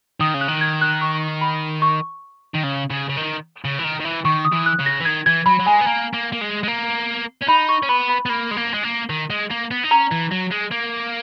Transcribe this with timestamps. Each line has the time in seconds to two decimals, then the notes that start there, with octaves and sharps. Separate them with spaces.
0.20 D#3 D#6
0.34 C#3
0.41 F#6
0.48 D#3
0.61 G#6
0.81 F#6
1.01 C#6
1.41 B5
1.82 C#6
2.54 D#3
2.63 C#3
2.90 C#3
3.09 C#3
3.17 D#3
3.65 C#3
3.79 E3
3.84 D#3
4.00 D#3
4.05 E3
4.25 D#3 C#6
4.45 D#6
4.52 E3
4.66 F#6
4.79 C#3
4.86 A#6
5.00 E3
5.05 D#3 G#6
5.26 E3 G#6
5.46 F#3 B5
5.60 F#3
5.66 G#3 G#5
5.81 B3
5.86 A#3 A#5
6.14 A#3
6.32 A#3
6.41 G#3
6.63 G#3
6.68 A#3
7.42 C#4
7.49 D#4 B5
7.69 C#6
7.83 C#4
7.89 B3 B5
8.09 B5
8.26 B3
8.29 A#3 B5
8.51 G#3
8.57 A#3
8.74 G#3
8.83 A#3
9.10 D#3
9.30 G#3
9.51 A#3
9.71 B3
9.84 D#4
9.91 C#4 A#5
10.12 E3
10.32 F#3
10.52 G#3
10.71 A#3